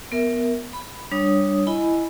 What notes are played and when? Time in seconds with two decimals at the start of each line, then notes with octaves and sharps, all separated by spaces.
0.12 B3 A#4 E5
0.73 B5
1.12 G3 D4 C#5 D#6
1.67 E4 D#5 G#5 B5